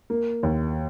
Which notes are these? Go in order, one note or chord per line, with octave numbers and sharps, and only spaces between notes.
A#3
D#2